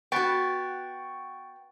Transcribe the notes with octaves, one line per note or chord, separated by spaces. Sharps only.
B3 F#4 G5 C#6 A6